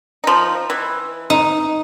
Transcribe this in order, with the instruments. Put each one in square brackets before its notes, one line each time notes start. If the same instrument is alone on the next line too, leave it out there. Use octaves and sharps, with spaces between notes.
[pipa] F3 D#4
E3
[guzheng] D#4